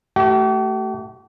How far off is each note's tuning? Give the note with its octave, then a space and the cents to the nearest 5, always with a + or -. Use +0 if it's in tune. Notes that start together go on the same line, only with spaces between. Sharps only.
A3 +0 G4 -45